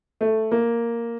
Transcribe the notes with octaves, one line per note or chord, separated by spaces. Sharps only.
A3
A#3